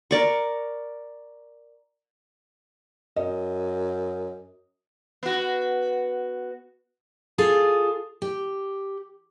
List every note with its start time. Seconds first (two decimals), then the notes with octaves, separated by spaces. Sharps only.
0.11 A#4 D5 C#6
3.16 F#2 D#5
5.23 B3 F#4
7.38 F4 G#4 A4
8.22 G4